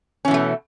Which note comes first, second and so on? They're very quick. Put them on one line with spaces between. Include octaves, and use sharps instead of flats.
C#4 E3 B2 A3